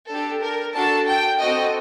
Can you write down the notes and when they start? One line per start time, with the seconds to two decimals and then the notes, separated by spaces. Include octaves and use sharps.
0.10 D4 G4 A4
0.43 A#4
0.75 D4 F#4 A4 A5
1.08 G5
1.40 C4 F#4 A4 D#5